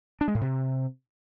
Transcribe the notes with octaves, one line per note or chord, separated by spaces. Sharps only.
D4
G#3
A2
C3